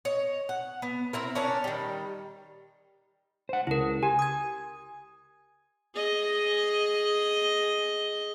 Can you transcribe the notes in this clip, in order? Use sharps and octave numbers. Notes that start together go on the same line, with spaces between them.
C#5 D#5
F#5
B3
C4 E4 A#4
C#4 D4 A#4 C#5
D#3 G3
C5 F#5
C#2 E4 A#4
G4 G#5
D#6 G#6
G#4 D#5